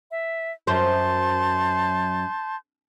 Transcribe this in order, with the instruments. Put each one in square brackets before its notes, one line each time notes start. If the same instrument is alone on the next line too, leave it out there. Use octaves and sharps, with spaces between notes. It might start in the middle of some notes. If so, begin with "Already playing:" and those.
[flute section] E5
[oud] F#2 C5 [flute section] A5 C6 G6